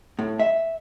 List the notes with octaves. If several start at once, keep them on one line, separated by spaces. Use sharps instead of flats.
A2
E5